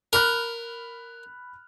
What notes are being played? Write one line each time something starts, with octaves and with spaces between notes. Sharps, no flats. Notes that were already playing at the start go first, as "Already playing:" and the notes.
A#4 B5 F6 F#6